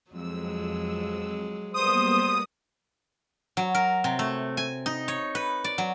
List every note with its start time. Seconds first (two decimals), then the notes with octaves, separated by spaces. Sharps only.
0.11 F2 F#3 G#3 E6
1.74 G3 A#3 B3 C5 D#6
3.57 F#3
3.75 A#4
4.04 C3
4.19 A3
4.57 G#5
4.86 D#4
5.08 C#5
5.35 B4
5.64 D5
5.78 F#3